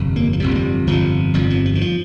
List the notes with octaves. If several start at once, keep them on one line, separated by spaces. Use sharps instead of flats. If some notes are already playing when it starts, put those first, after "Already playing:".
Already playing: G1 F2 C3
A#3
F3
G1 F2 C3 G3
A#3
G3
G1 F2 C3 F3
G1 F2 C3 G3
F3
F3
D#3
F3